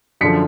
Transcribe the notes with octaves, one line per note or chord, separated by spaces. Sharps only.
F#2 D3 F3 B6 C#7